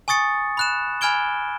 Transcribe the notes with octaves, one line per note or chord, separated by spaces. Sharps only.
G#5 C#6 D#6 A6 C#7
B5 F#6 E7
G#5 B5 F6 G#6 D7 G7